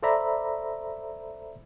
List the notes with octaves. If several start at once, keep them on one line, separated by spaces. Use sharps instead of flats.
A4 C5 D5 E5 A#5 B5